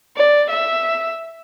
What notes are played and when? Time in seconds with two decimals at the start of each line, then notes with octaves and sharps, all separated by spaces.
0.16 D5
0.50 E5